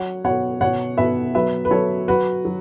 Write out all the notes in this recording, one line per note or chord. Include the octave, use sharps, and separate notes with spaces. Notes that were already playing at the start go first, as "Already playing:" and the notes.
Already playing: F#3 C#5 F#5
B2 C#5 F#5
B2 C#5 F#5
B2 B4 E5
F#3 B4 E5
B4
F#3 A4 C#5
F#3 F#4 B4
F#3